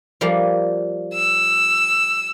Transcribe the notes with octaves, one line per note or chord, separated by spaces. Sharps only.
F3 G3 A#3
E6